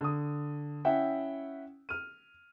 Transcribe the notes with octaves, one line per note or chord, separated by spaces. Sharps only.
D3 D#6
C#4 E4 E5 F#5 G5
F6 D#7